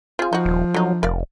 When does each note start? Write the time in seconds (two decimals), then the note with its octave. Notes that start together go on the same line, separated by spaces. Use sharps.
0.19 C4 F4 G#4
0.33 F3 D#4 F#4
0.45 D#1
0.74 D3 F#3 D#4
1.03 F1 A#4 D5 F5